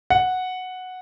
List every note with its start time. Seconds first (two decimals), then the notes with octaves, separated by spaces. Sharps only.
0.10 F#5